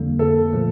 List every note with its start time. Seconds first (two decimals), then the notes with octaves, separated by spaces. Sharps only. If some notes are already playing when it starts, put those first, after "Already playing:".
Already playing: F2 D3 G3 A#3
0.19 A4
0.53 A#2 F3 A3